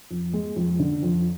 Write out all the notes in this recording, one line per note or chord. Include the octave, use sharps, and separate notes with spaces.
F2
G#3
F2
D3
F2